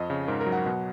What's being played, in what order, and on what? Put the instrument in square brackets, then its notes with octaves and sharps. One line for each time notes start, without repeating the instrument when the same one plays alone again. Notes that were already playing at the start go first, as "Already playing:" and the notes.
Already playing: [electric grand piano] F2 D#5
C#3
G#2 A#4
A#4
F#3
F#5
B2 F#5